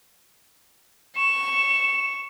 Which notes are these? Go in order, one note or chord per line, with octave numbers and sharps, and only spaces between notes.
C#6 E7